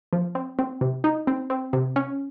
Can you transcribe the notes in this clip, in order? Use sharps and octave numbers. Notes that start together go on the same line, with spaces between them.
F3
C4
C4
C3
D#4
C4
C4
C3
C#4